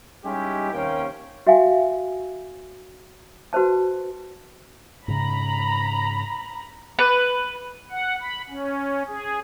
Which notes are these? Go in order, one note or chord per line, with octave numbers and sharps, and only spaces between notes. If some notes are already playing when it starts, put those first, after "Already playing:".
G3 G#3 C#4 D#4 E4 G4
D#2 C3 A#3 C#4 F5 G5
F#4 E5 F5 G5 G#5
F#4 B4 C5 A5
G#2 C#3 A#5 B5
B4
F#5
B5
C#4
G#4